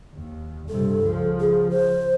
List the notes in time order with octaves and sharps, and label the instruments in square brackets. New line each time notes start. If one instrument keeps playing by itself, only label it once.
[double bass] D#2
[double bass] G2 C3 [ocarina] A4
[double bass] C#2 F3
[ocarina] G#4
C5